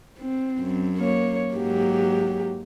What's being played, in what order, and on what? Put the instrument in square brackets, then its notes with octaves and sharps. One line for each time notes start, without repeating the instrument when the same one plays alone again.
[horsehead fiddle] C4
[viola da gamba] F#2
[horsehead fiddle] A#3 C#5
[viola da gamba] G#2 A#3 [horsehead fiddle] F#3 G4